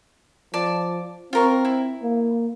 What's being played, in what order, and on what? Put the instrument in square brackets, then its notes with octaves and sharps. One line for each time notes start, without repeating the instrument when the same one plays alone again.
[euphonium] F3 [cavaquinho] D5 A5
[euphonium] C4 [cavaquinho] F4 A#4 C#6
[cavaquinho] E4
[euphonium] A#3